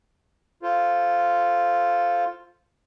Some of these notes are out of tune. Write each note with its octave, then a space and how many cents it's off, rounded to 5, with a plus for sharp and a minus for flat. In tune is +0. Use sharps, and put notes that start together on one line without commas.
F4 +0 A4 +0 C5 +0